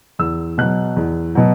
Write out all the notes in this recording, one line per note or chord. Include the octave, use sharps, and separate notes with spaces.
E2 E6
B2 F#3 F#6
E2
B2 F#3